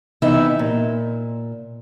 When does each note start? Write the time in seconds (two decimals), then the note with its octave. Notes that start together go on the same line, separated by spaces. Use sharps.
0.22 C3 E3 B3 D#4 E4 E5
0.59 A#2